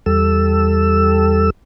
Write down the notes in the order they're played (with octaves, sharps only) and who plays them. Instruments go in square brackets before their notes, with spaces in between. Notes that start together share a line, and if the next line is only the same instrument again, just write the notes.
[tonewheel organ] E2 G3 A4 E6